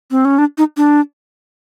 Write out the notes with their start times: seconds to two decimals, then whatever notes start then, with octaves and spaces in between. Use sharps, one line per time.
0.11 C4
0.25 C#4
0.38 D4
0.58 D#4
0.77 D4